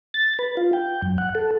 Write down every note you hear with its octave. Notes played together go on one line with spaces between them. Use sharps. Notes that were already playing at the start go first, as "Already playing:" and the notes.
A6
B4
F4
G5
F#2
F#5
A4